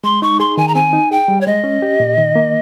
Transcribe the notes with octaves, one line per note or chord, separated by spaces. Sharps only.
G#3 C6
D#4 C#6
G#4 C6
D#3 G#5
A#5
C4 G#5
D#4
G#4 G5
G3
C#5
G#3 D#5
C#4
G4
A#2
D#3
A#3